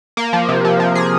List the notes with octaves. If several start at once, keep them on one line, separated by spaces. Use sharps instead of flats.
A#3
F3
C3
F3
F3
G#4